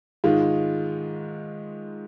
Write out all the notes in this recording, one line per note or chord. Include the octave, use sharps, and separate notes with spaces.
G#2 D#3 G#3 F4